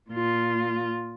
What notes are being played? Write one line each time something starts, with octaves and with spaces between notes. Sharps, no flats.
A#2 F4